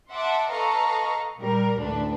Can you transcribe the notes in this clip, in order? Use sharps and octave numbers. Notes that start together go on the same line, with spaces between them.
E5 F#5 A5 C6 D6
A4 B4 D#5 F5 A#5 C#6
A#2 G3 A#4
A1 D2 D4 B4